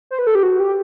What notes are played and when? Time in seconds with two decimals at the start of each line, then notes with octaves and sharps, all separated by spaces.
0.11 C5
0.19 B4
0.27 A4
0.35 G4
0.43 F#4
0.60 G4